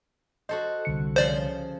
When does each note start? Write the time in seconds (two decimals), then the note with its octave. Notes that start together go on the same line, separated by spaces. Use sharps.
0.49 F#4 A4 C5 D#5
0.85 C2 D3 C#7
1.16 C#3 F3 C5 D5 C6